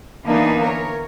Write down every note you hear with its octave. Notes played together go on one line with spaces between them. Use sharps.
D3 E3 A#3 B3 D4 D#4
A#4 C#5